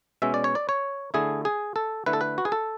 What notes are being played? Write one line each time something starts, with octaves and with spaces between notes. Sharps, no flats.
B2 G#3 C#4 E5
D5
C#5
D5
C#5
D3 A3 E4 G#4
G#4
A4
D3 A3 E4 B4
A4
B4
F#4
G#4
A4